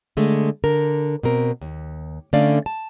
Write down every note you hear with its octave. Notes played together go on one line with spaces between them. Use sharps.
D3 G#3 A3
D3 A#4
B2 C4 A#4
D#2
D3 A3 C#4 D5 F5
A5